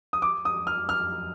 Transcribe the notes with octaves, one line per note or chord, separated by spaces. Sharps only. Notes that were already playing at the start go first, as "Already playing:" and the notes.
D#6
D6
D#6
F6
F6